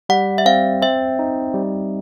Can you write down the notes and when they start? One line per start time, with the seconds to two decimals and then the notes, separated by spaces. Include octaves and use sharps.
0.09 G3 F#5
0.38 E5
0.46 C4 F5
0.82 C4 E5
1.19 D#4
1.54 G3